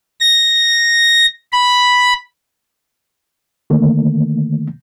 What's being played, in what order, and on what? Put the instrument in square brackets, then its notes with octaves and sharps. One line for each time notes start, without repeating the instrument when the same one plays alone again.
[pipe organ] A#6
B5
[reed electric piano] D3 D#3 A3 A#3